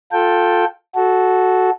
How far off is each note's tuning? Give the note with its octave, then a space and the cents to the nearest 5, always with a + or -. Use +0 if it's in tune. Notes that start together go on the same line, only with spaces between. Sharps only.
F4 +20 A4 +0 G5 +0
F#4 +0 A4 -15